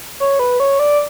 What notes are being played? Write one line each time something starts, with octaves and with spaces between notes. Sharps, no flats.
C#5
B4
C#5
D5